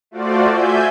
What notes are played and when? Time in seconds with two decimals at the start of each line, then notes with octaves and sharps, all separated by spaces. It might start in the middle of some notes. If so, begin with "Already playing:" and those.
0.11 A3 F4 F#4 C5 D5
0.50 E5 G#5 G6